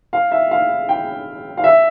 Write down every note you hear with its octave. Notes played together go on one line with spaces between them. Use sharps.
F5
E5
F5
G5
F5
E5